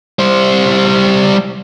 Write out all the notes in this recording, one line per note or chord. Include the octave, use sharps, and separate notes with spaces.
G3 C5